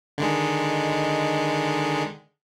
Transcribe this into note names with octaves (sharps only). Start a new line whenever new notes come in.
D3 D#3 G#3